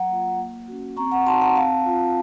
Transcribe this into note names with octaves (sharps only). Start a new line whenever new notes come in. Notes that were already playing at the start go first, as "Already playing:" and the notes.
Already playing: F#3 F#5 A#5
A#3 F4
A#3
C#4 F#4
C4 A#5 C#6
F#5 A#5
D#4 F#4 A5 C6
F#5 A#5
C4 F5 A5
F4